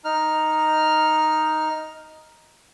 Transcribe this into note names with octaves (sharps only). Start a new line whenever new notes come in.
D#4 F6